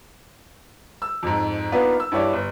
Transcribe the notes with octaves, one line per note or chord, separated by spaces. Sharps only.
E6
F2 G#2
A#3 B3 D4 D#4 F4 B4
E6
G2 E4 G4 C#5 D5
G1